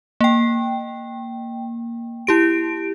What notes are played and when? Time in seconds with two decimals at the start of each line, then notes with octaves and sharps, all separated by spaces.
0.21 A#3 G5
2.27 E4 G4 D7